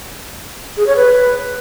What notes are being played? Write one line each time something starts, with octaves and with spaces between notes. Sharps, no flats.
G#4
C#5
B4